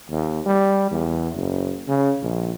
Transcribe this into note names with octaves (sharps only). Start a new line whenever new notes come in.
D#2
G3
E2
F#1
C#3
A#1